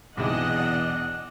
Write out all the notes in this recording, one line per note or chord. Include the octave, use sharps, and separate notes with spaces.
B1 E2 C3 G#3 D4 D#5 F#5